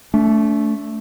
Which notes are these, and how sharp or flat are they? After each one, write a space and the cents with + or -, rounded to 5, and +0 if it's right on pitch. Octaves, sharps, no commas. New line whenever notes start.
A3 +0 D4 -40